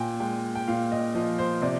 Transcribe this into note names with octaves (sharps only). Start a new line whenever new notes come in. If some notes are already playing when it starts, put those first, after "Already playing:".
Already playing: A#2 G5 G#5
G#3 G5
G5
A#2 F5
D#5
F3 D#5
C5
C3 D5